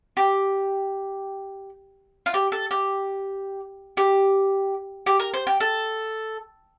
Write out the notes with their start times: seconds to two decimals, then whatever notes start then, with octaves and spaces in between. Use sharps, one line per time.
0.17 G4
2.26 F4
2.34 G4
2.52 A4
2.71 G4
3.97 G4
5.06 G4
5.20 A#4
5.34 C5
5.47 G4
5.60 A4